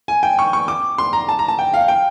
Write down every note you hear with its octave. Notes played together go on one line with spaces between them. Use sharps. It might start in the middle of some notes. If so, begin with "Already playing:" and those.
G#5
G5
C#6
C#6
D6
C6
A#5
A5
A#5
A5
G5
F5
G5